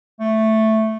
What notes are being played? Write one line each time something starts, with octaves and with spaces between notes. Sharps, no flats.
A3